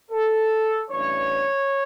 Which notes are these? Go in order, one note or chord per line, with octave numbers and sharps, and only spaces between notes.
A4
A1 G2 E3 C#5